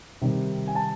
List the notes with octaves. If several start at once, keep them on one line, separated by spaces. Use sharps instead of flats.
C3 D#3 G3
G#5
A5